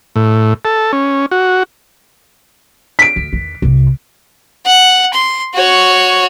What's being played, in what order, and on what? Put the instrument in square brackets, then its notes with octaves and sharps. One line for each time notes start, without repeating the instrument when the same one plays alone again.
[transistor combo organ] A2
A4
C#4
F#4
[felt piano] B6 D7
[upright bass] D2
E2 D#3
C2 C3
[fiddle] F#5
C6
F#4 C#5